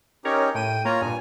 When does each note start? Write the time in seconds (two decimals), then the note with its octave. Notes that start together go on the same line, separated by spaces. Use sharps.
0.25 C#4 D#4 G4 A#4 C#5
0.54 A2 G5 D#7
0.85 A#3 F4 C#5 A#5
1.01 G2 A#2 G#5